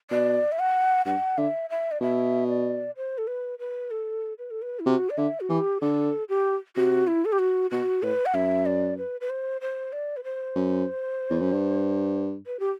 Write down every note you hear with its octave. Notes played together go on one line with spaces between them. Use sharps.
B2 D5
E5
F#5
G2 F#5
D3 E5
E5
D5
B2 E5
D5
C5
A4
B4
B4
A4
B4
A4
B4
E4
C3 F#4
D5
D3 E5
F#4
E3 G4
D3 A4
G4
C3 F#4
E4
A4
G4
F#4
B2 F#4
A2 B4
F#5
F#2 E5
D5
B4
B4
C5
C5
D5
B4
C5
F#2
E2
F#2
G2
B4
G4